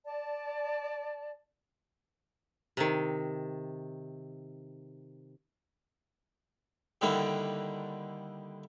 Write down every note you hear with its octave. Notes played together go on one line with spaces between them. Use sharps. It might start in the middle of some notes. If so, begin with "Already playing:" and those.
D5 A5
C3 D#3
D3 D#3 G3 A#3 D4 E4